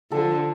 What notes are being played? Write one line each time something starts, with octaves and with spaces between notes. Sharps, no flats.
D3 F3 A4